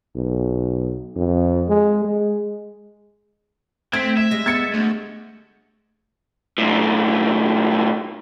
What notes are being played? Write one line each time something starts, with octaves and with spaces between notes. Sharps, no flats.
B1
F2
G#3
G#3
A3 C4 G#6 B6
E5 E7
G3 G#3 A#6
B3 G#6 A6 C#7
D2 A3
B1 A2